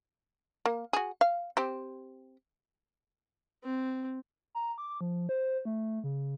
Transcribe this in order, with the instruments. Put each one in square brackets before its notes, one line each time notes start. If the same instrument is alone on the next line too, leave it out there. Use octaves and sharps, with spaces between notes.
[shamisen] A#3
F#4 G#4
F5
C4 G4
[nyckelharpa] C4
[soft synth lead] A#5
D6
F3
C5
A3
C#3